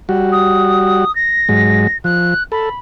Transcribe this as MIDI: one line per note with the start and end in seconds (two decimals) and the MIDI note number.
0.09 1.05 55
0.09 1.05 66
0.32 1.14 87
1.15 1.97 94
1.49 1.87 44
1.49 1.87 54
1.49 1.87 56
2.04 2.34 53
2.04 2.43 90
2.52 2.69 69
2.52 2.79 83